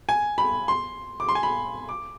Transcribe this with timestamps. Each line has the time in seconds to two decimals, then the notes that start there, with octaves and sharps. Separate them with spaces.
0.09 G#5
0.38 B5
0.68 C6
1.20 D6
1.29 C6
1.35 G#5
1.43 B5
1.89 D6